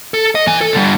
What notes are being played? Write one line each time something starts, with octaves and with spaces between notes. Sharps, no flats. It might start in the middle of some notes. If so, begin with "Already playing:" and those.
A4
D#5
E3 G#5
A4
D3 G3